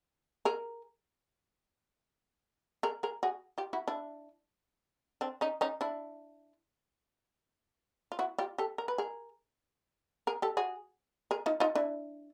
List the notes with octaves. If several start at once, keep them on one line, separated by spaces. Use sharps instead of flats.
G#4 A#4
G#4 A#4
G#4 A#4
F#4 G#4
F4 G4
E4 F#4
D4 E4
C4 D4
C#4 D#4
C#4 D#4
D4 E4
F4
E4 F#4
F4 G4
G4 A4
A#4
B4
G#4 A#4
G#4 A#4
G4 A4
F#4 G#4
G#4 A#4
D#4 F4
D#4 F4
D4 E4